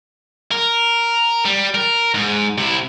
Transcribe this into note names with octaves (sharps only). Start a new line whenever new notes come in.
A#4
G3
A#4
G#2
C3 E4